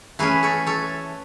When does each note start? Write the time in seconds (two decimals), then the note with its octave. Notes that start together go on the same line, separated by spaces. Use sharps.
0.19 E3 A3 C#4 G#4 B4
0.43 A4 C#5
0.67 A4 C#5